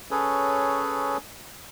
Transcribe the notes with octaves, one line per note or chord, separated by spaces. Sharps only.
C#4 G#4 A4 B4 C#5